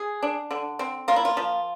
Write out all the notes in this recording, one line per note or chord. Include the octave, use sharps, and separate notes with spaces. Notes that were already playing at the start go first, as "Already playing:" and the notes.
Already playing: G#4
D4
D3
C4
A#3 F4
E4
F4
F3